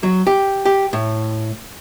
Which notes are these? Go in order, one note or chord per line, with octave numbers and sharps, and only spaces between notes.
F#3
G4
G4
A2